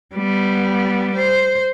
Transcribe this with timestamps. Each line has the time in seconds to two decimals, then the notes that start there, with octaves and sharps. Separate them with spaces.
0.15 G3 B3
1.15 C5